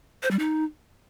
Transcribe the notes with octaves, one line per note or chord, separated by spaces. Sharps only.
C5
G3
D#4